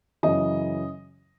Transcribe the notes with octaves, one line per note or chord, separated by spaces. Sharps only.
F#2 C#3 E3 D#5